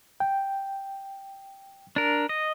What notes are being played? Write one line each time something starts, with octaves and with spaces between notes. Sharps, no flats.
G5
D4 A#4
D#5